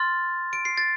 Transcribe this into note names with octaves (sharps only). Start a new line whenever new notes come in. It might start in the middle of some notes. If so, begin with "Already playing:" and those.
Already playing: C6 F6 A6
D7
C7
A6